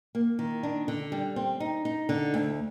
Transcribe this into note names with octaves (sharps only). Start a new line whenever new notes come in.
A#3
D#3
D4
D3
G3
C4
D#4
D#4
D3
D2